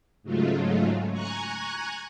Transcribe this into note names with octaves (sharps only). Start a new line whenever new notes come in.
G#2 C#3 F#3 G#3 A3 F4
G#5 A#5 C#6 F#6 G#6